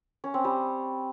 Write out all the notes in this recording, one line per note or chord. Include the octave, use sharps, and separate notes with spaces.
C#4
C4
G3